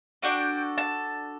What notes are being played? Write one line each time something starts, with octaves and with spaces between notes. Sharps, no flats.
D4 F#4 A4 G5
A5